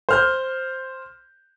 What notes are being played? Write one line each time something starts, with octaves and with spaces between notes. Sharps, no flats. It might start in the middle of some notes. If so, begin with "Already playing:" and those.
C5 F6 G6